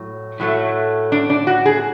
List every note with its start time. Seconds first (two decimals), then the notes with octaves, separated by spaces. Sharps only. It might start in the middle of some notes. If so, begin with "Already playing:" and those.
Already playing: A2 F#3
0.40 A2 F#3 A3
1.12 D4
1.30 D4
1.47 F#4
1.66 G#4